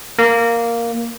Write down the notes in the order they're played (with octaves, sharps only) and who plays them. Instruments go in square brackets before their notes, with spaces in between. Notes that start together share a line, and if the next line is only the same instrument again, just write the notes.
[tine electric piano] A#3